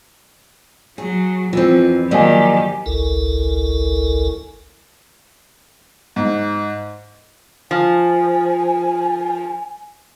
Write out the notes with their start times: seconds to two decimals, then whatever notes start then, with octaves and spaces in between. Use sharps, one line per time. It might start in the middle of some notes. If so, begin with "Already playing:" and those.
0.98 F#3 G#4
1.53 F2 E3 C4 F4
2.11 D#3 F3 F#3 A#3 G4 D5 D#5 G#5
2.86 G#1 C#2 E4 A4 A#4
6.16 G#2
7.71 F3 G#5